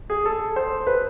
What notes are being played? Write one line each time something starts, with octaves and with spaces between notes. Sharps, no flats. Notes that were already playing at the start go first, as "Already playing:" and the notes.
G#4
A4
C5
B4